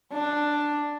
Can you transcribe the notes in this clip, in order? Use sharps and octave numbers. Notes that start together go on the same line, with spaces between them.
D4